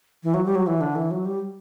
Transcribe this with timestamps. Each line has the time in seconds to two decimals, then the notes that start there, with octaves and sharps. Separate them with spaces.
0.24 E3
0.34 F#3
0.46 G3
0.55 F#3
0.67 E3
0.81 D3
0.95 E3
1.11 F#3
1.25 G3